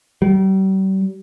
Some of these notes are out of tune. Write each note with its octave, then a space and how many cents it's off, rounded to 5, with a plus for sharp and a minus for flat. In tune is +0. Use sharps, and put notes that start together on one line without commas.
G3 -40